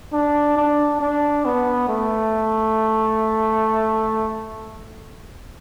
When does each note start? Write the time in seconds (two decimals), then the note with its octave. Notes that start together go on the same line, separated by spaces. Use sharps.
0.13 D4
0.57 D4
1.01 D4
1.45 B3
1.89 A3